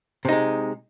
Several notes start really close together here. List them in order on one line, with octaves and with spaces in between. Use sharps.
C3 D#4 G#3